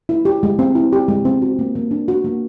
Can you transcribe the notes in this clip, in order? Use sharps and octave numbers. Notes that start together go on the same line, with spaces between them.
E4
G4
G#3
C4
E4
G4
G#3
C4
F#4
A#3
A#3
D4
F#4
A#3